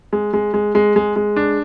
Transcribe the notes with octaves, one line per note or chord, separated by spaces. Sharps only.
G#3
G#3
G#3
G#3
G#3
G#3
D4